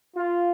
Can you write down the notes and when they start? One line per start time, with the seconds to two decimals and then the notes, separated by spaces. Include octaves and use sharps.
0.16 F4